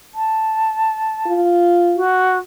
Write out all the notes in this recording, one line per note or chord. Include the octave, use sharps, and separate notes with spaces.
A5
F4
F#4